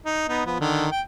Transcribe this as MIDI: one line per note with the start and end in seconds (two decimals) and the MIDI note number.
0.05 0.27 63
0.28 0.44 59
0.28 0.44 63
0.46 0.56 53
0.46 0.56 59
0.60 0.87 50
0.60 0.87 51
0.91 1.01 79